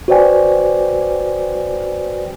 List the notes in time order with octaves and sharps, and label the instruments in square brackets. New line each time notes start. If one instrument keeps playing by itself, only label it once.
[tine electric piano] F#4 B4 C5 D5 G5 G#5